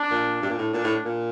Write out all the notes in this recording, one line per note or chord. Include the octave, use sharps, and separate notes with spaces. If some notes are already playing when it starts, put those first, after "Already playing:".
Already playing: D4
A#2
G2
A#2
A2
A#2 D4
A2
A#2